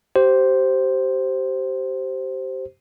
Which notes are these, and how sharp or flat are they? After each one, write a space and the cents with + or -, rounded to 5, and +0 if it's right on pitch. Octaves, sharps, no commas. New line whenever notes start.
G4 -25 C5 +0